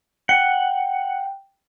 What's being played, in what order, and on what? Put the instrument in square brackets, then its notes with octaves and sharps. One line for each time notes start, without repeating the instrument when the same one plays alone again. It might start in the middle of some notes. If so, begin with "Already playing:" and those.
[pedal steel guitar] F#5 [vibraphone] G5